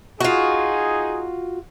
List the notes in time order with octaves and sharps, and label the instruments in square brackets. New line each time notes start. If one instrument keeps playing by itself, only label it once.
[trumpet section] D#4 G#4 [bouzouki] F4 F#4